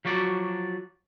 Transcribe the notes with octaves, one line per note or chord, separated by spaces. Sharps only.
F3 F#3 F#4 D5